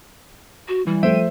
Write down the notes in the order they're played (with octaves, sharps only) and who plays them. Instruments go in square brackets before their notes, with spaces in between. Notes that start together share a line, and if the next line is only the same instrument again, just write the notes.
[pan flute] F#4
[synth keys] E3 [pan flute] G3
[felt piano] F3 A3 [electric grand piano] C5 E5 [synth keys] G5 D#7